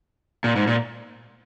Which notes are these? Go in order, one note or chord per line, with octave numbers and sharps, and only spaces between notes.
A#2
G#2
A#2